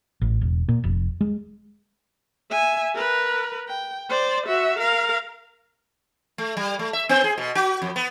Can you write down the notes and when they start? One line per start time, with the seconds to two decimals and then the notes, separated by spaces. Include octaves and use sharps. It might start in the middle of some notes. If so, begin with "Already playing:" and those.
0.22 A1
0.41 E1
0.69 A#2
0.84 F1
1.21 G#3
2.51 E5 G#5
2.95 A#4 B4
3.68 G5
4.09 C5 D5
4.46 F#4 E5
4.79 A#4 F5
6.38 A3
6.57 G3
6.79 A3
6.93 E5
7.09 B3
7.24 G#4
7.38 B2
7.55 F#4
7.82 F2
7.96 B3